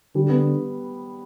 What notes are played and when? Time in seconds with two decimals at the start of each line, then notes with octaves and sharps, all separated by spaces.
0.15 D3 G3
0.30 B3